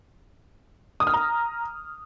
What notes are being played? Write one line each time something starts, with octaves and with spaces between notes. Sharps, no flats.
D#6
F6
A#5